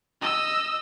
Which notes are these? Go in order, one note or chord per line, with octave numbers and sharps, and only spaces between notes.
D#5 E6